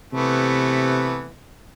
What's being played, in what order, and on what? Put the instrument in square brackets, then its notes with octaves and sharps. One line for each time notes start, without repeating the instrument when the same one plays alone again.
[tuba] C3 [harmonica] E3 A3 B3